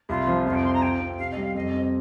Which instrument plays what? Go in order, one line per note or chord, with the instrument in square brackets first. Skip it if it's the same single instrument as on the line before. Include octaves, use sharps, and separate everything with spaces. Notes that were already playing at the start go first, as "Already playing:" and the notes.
[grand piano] C2 [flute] F4
[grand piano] F3
[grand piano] F2 [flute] F4
[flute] G5
[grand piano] C4 [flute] C6
[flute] A#5
[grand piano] F4 [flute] G5
[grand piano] C4
[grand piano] C3 [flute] F5
[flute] D#5
[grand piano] G3
[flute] F5
[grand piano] F2 [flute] D#5
[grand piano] C4